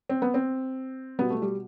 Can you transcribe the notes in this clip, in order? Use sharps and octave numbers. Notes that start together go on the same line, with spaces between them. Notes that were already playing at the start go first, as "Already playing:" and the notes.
C4
B3
C4
B2 G3 B3
A3
G3